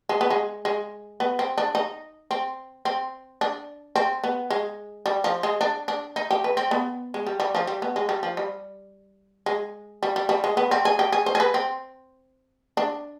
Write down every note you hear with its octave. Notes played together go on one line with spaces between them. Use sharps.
G#3
B3
G#3
G#3
B3
C4
D4
D#4
C4
C4
D4
C4
B3
G#3
G3
F3
G#3
D4
D4
D#4
G4
B4
C4
B3
G#3
G3
G3
F3
G3
B3
G#3
G3
F3
G3
G#3
G3
G3
G3
G#3
B3
C4
G#4
G4
G#4
C5
G#4
B4
C4
D4